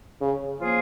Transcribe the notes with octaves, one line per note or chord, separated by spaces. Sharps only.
C#3
F3 A#3 F4 G#4